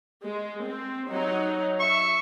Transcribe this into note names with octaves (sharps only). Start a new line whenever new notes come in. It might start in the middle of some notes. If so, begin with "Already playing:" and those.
G#3
C4
F#3 D#4
E5 C#6